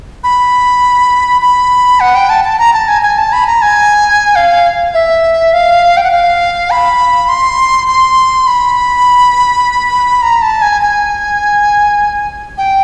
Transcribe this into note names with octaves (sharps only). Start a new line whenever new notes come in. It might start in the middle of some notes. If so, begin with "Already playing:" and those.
B5
B5
F#5
G5
A5
A5
A#5
A5
G#5
G#5
A5
B5
A#5
G#5
F5
E5
F5
G5
F#5
F5
B5
C6
C6
B5
A#5
A5
G#5
G#5
G5